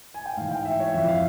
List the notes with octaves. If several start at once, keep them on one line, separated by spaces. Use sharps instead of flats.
G#5
G5
G#2 E3 F5
G5
E5
C#5
F2 E3 E5
F5